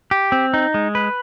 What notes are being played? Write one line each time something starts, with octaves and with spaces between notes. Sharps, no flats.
G4
C4
D#4
G#3
B4